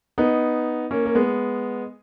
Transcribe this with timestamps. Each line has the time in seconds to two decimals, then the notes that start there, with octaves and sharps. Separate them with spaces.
0.18 B3 D#4
0.91 A#3 C#4
1.05 A#3
1.15 G#3 B3